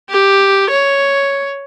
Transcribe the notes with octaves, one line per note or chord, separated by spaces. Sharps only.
G4
C#5